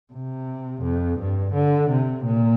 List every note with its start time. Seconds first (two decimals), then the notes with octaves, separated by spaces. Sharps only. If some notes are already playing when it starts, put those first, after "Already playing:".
0.13 C3
0.83 F2
1.20 G2
1.55 D3
1.91 C3
2.26 A#2